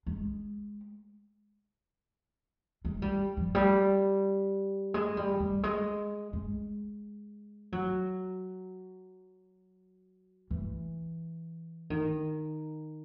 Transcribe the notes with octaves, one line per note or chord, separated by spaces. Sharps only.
G#3
G#3
G3
F3
G3
G#3
G3
G3
G#3
G#3
F#3
E3
D#3